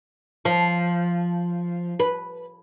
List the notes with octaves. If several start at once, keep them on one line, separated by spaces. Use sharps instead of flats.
F3
B4